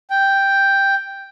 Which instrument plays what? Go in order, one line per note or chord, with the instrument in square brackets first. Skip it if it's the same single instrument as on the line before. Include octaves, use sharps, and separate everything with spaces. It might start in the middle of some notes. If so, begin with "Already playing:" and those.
[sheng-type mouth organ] G5